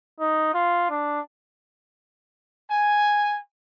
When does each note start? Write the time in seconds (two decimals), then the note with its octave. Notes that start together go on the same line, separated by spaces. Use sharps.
0.20 D#4
0.54 F4
0.90 D4
2.70 G#5